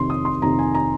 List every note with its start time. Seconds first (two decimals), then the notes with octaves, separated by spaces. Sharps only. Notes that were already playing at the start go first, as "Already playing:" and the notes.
Already playing: F2 C3 D#3 C6
0.10 D#6
0.25 C6
0.42 F2 C3 D#3 A#5
0.59 G#5
0.75 A#5